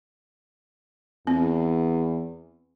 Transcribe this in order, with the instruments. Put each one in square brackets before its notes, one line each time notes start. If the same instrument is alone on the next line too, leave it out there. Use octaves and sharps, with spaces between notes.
[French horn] E2 [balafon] C4